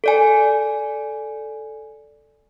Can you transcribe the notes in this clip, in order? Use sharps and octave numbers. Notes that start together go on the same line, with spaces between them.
A4 D5 G#5